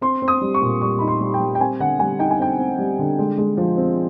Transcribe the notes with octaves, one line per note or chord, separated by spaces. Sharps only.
C4 C6
C4
D#6
G3
C#6
A#2
G3 C#6
D#4 B5
C6
G3
G5
G3
G5
C4 G#5
D3 F#5
G3 G#5
D#4 G5
G#5
C4 G5
C4
G3
D3
G#3
G#3
F3
C4